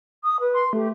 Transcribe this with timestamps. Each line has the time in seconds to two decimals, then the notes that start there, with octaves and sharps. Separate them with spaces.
0.24 D#6
0.40 B4
0.54 C6
0.73 A3 G4